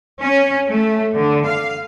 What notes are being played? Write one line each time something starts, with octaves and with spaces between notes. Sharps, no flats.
C#4
A3
D3
F5